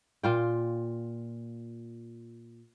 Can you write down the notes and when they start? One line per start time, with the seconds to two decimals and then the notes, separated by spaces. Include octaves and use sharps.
0.23 A#2 F4 G5